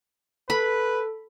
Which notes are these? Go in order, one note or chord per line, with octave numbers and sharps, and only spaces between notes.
A4 B4 B5